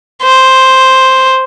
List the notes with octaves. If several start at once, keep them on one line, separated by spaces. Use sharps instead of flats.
C5